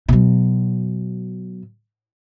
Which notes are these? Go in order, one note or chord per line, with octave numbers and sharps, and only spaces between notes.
B2 F#3